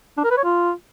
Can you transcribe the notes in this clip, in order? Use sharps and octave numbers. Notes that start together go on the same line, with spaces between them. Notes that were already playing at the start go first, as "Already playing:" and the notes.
D4
A#4
B4
C#5
F4